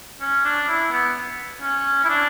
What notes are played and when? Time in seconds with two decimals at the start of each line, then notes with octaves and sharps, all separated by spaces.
0.21 C#4
0.45 D4
0.68 E4
0.92 B3
1.62 C#4
2.04 E4
2.10 D4